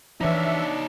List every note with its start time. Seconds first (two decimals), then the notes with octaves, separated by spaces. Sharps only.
0.21 E3 F3 D4 D#4 C#5 E5